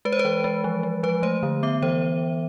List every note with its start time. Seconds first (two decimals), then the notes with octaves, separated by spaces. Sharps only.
0.05 G#3 B4
0.13 C5
0.19 B4
0.25 E3
0.44 G#3
0.64 F3
0.83 G#3
1.03 F3 B4
1.23 A3 C5
1.43 D3
1.63 B3 E5
1.82 E3 C5